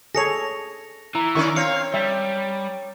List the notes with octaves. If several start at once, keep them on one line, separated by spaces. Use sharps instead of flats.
G#4 A4 C#5 A#6 C#7 F7
E3 A#5
D#3 C#4 A#4 D5 C#6
C4 C#5 F5 C#7
G3 E5